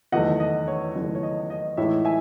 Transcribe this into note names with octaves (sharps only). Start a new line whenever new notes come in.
F#1 E2 D#3 A3 D#5 F#5
D#5
C#5
F#1 E2 D#3 A3
C#5
D#5
D#5
A2 E3 G#3 D#4 C#5 E5
E5 G#5